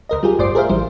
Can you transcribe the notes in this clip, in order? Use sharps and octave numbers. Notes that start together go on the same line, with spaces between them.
D2 A#4 D#5
G3 F4 G4 G#4
G1 A2 C5 D5 C6 D6
G#4 A#4 C5 E5 F5
A1 E3 G3 C5